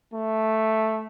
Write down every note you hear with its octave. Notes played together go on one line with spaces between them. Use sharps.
A3